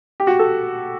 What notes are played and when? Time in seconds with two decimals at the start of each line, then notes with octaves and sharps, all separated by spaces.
0.20 G4
0.27 F#4
0.39 A4